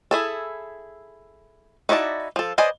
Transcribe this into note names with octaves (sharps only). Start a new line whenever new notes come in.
E4 G#4 A4
D#4 E4 F#4 D5 A5
F3 A4
B4 C5 D5 D#5 G#5